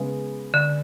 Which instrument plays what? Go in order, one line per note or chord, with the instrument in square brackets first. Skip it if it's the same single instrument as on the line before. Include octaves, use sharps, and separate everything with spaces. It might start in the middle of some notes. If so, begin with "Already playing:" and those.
Already playing: [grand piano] C#3 G#3 B3
[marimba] D3